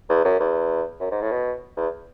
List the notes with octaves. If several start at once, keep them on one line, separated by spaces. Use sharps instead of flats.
E2
F#2
E2
F#2
G#2
A2
B2
E2